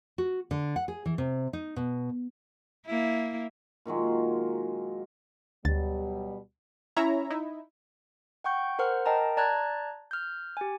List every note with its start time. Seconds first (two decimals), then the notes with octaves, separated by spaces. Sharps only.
0.18 F#4
0.51 D3
0.76 F#5
0.88 G#4
1.06 E3
1.18 C3
1.53 D#4
1.76 B2
2.86 A#3 E4
3.85 A#2 D#3 F#3 G#3
5.65 D2 B2 F#3 G3 A6
6.97 C#4 E4 C#5 E5 A#5
7.30 D#4 E4
8.44 F#5 G5 C#6 G6
8.79 A#4 C5 F#5 F6
9.06 A#4 D#5 G5 A5 A#5
9.37 D5 A5 A#5 F#6 G#6
10.11 F6 G6
10.57 G4 G#5